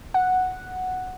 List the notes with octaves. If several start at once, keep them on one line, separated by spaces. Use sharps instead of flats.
F#5